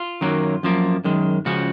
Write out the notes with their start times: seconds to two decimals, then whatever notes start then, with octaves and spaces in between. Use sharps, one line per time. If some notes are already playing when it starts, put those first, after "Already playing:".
Already playing: F4
0.21 F#2 D#3 F#3 A#3
0.63 F#2 F3 A#3
1.04 F#2 D#3 G#3
1.46 C#2 C#3 F3 F#4